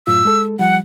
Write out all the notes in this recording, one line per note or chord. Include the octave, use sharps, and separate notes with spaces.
F#2 A2 F4 E6
G#3 A4
F3 G3 F#5